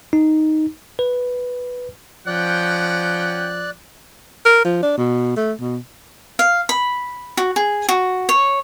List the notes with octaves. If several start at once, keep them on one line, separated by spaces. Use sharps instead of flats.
D#4
B4
F3 C#4 D5 F#5 G5 F#6
A#4
F3
D4
B2
A3
B2
F5
B5
F#4
G#4
F#4
C#5